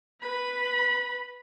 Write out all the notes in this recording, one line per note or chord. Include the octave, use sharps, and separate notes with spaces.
B4 B5